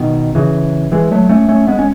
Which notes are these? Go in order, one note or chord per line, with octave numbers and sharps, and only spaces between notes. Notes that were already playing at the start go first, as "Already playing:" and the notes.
Already playing: B2 D#3
C#3 E3
E3 G#3
F#3 A3
A3 C#4
A3 C#4
G#3 B3
C#4